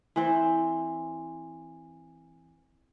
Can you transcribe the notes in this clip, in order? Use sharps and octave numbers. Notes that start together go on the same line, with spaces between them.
E3 C4 C5